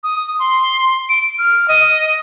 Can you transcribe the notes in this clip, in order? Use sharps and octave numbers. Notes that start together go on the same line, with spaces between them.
D#6
C6
D7
F6
D#5